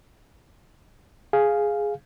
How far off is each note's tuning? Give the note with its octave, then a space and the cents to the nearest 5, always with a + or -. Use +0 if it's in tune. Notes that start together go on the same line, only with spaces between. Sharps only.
G#4 +0 F5 +0